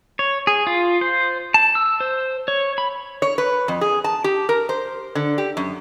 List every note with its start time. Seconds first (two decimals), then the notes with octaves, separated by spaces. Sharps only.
0.19 C#5
0.47 G#4
0.67 F4
1.01 C5
1.54 A5
1.75 E6
2.00 C5
2.48 C#5
2.78 B5
3.22 C#5
3.38 B4
3.68 F2
3.81 G#4
4.04 A5
4.24 G4
4.49 A#4
4.69 C5
5.15 D3
5.38 G4
5.57 F#2